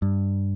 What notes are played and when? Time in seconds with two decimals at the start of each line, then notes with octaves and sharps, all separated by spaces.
0.02 G2